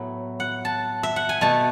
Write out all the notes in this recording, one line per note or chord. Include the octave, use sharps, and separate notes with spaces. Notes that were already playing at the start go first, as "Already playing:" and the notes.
Already playing: A2 F#3 B3
F#5
A5
E5
F#5
G#5
B2 A3 A5